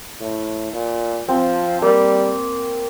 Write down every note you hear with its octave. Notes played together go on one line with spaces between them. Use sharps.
A2
A#2
F3 C4
G3 A#3